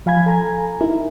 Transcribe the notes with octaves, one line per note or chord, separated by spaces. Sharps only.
F3 F5 G#5 B5 G#6
A4 G#5 A#5
D#4 E4 A#4